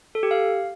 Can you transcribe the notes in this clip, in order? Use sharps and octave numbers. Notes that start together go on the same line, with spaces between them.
A4
G4
F5